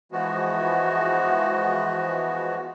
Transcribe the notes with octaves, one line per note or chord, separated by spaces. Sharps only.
E3 F3 G#3 B3 F#4